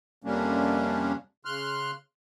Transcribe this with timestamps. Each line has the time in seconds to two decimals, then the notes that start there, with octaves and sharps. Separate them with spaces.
0.24 F2 C3 G3 A#3 C#4 D4
1.45 C#3 C6 F6 F#6